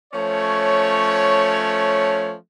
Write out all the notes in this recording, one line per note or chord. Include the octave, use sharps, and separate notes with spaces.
F3 A3 C#4 C#5